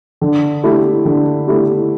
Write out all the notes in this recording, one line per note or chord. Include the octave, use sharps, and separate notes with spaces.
D3
A3 E4 G4
D3
A3 E4 G4